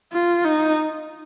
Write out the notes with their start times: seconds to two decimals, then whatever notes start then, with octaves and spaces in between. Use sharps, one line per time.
0.13 F4
0.45 D#4